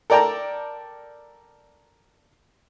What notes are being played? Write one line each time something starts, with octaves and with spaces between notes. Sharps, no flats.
A4 A#4 D5 G5 A5 A#5